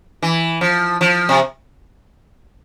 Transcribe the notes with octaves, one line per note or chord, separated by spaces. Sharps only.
E3
F3
F3
C3